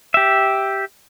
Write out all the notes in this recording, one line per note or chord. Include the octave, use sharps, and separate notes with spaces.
G4 E5